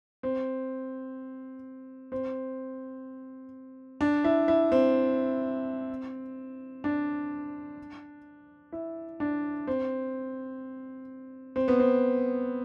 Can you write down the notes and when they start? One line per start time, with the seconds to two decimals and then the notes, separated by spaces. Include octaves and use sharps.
0.23 C4
2.12 C4
4.01 D4
4.24 E4
4.48 E4
4.72 C4
6.84 D4
8.72 E4
9.20 D4
9.67 C4
11.56 C4
11.68 B3
11.80 C4